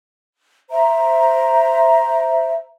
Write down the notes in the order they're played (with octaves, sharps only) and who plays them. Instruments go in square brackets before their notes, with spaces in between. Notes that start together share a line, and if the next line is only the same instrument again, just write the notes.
[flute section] C5 E5 A#5